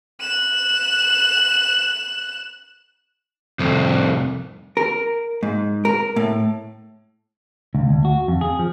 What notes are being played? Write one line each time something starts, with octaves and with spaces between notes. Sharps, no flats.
F#6 E7
C2 F2
A#4
G#2
A#4
A2
C#2
D2
F#4
F2
G#4
F3